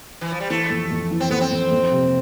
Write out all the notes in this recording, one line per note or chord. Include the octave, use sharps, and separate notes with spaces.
E3
F3
G3
E3 A3
F2
F2
E3
C4
F2 B3
C4
F2
F2
C3